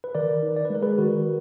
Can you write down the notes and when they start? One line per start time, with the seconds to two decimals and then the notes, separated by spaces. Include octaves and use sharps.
0.04 B4
0.15 D#3 A#4 D5
0.43 D#4
0.56 D5
0.65 B4
0.70 G#3 A#4
0.82 G#4 B4
0.98 D#3 F#4 A#4